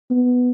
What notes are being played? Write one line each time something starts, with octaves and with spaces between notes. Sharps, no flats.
B3